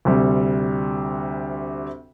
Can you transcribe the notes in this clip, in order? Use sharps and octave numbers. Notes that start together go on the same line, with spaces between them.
D2 C3 G3